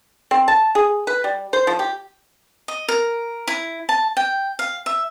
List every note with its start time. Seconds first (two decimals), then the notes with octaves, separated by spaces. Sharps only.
0.31 C4
0.48 A5
0.75 G#4
1.07 B4
1.24 G3
1.53 C5
1.67 F3
1.79 G4
2.68 D#5
2.88 A#4
3.48 E4
3.89 A5
4.17 G5
4.59 F5
4.86 E5